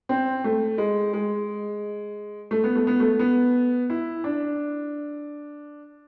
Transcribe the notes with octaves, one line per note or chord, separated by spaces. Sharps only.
C4
A3
G#3
G#3
A3
B3
A3
B3
A3
B3
E4
D4